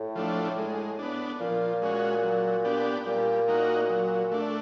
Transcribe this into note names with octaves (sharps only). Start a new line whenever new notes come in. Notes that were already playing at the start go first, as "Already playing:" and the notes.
Already playing: A2
F3 A3 D4
G#3
B3 D4
A#2 F3
G#3 C#4 F#4
F#3
B3 D4 G4
A#2 G3
A#3 D#4 F#4
F#3
A3 D4